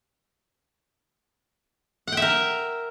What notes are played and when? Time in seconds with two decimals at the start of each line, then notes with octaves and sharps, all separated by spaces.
2.07 F#5
2.12 G5
2.17 E5
2.22 A#4